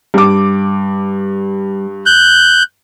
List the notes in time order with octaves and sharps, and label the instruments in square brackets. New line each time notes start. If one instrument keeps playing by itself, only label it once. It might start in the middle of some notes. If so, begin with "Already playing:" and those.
[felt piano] G2 D6 [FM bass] G3
[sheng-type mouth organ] F#6 G6